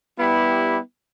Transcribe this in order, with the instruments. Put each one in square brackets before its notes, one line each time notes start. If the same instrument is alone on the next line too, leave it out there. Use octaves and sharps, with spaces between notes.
[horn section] G3 B3 E4 G4